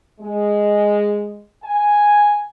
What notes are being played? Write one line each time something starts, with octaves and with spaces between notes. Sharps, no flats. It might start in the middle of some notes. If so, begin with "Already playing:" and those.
G#3
G#5